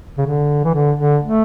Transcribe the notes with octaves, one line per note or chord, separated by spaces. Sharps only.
C#3
D3
E3
D3
D3
A3